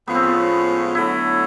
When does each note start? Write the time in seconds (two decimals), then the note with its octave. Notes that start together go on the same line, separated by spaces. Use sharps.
0.07 A2 F3 G#3 B3 C#4 F4
0.15 C4
0.23 B3
0.94 D3 F#3 A3 E4